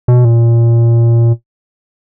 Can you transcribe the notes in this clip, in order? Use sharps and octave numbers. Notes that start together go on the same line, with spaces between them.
B2
A#2